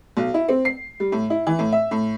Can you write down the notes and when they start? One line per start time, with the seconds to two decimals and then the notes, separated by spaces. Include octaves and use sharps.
0.17 B1
0.34 E4
0.49 C4
0.65 C7
1.00 G3
1.12 A2
1.30 E4
1.47 E3
1.59 A2
1.73 E5
1.91 A2